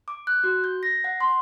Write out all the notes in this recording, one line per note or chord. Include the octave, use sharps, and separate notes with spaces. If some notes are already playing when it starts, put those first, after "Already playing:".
D6
F#6
F#4
G6
A#6
F#5
C6